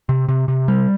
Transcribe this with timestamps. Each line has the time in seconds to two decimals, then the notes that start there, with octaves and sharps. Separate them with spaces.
0.09 C3
0.29 C3
0.48 C3
0.68 G3